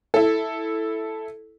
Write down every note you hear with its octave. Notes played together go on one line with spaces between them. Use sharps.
E4 A4